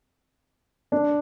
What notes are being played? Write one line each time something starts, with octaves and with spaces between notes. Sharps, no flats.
D4